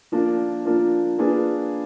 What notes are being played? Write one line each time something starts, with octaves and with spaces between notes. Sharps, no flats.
F3 A#3 D4 F4 A#4
F3 A#3 D4 F4 A#4
A#3 D4 F4 G#4 B4